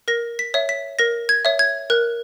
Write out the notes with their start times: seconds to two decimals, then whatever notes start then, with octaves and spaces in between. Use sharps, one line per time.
0.08 A#4 A#6
0.39 B6
0.54 C#5 E5
0.69 B6
0.99 A#4 A#6
1.29 G#6
1.45 C#5 E5
1.59 G#6
1.90 A#4 F#6